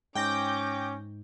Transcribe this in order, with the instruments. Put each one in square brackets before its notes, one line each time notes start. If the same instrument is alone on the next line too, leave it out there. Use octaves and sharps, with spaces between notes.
[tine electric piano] G#2 [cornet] C#4 [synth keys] G5 G6 A#6 [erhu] D6